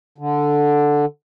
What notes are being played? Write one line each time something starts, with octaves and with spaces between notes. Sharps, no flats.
D3